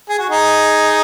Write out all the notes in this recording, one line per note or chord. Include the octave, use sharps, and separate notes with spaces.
G#4
F#4
D#4 G#4